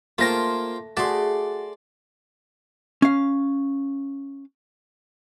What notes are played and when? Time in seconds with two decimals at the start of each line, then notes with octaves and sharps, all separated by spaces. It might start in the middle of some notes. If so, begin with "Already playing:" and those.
0.18 A3 A#3 F4 C5 G5 A#6
0.97 A3 F#4 G#4 D5 C6
3.02 C#4 F5